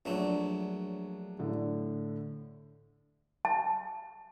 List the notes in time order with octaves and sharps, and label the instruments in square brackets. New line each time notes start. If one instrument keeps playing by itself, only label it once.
[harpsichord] A#1 F#3 A3 [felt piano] D4 C#5
[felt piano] A2 D3
[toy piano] A5